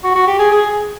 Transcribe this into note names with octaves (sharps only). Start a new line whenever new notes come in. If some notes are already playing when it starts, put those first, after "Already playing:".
F#4
F#4
G4
G#4
G#4